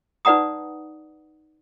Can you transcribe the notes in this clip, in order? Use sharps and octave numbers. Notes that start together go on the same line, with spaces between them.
D#4 B4 D5 F#5 A#5 D#6